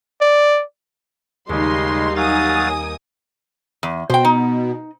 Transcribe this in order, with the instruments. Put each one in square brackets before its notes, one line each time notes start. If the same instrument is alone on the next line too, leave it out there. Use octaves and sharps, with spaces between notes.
[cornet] D5
[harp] D#2 [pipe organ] C#3 G#3 [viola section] G3 D#4 [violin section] D#5 C6
[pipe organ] F#3 F5 A6 [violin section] A#3 G#5 D#6
[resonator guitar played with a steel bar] E2
[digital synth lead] B2 [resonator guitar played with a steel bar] C5 G5
[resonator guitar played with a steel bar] D#4